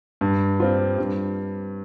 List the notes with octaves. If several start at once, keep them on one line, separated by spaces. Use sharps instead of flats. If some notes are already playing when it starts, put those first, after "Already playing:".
G2
G3 C4 F4
G2